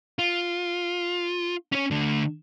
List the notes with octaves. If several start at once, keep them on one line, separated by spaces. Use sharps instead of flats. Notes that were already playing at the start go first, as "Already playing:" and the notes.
F4
C#4 C#5
D3 A3